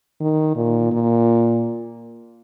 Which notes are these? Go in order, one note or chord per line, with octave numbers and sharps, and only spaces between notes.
D#3
A#2
A#2